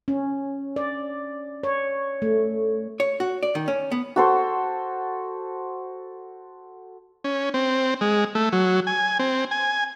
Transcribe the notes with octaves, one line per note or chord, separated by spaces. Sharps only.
C#4
D5
C#5
A3
C#5
F#4
D5
D#3
C#4
B3
F#4 A4 C5
C#4
C4
G#3
A3
F#3
G#5
C4
G#5